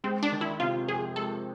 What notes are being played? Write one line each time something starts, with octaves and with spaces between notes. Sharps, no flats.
G#3 C4
D4
D#3
E4
C3 F4
F2 G#4
G#3 A4